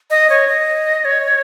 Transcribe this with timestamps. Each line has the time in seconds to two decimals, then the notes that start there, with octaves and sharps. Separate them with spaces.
0.10 D#5
0.30 C#5
0.48 D#5
1.05 C#5